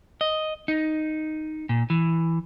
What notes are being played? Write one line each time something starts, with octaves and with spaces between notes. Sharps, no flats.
D#5
D#4
A#2
E3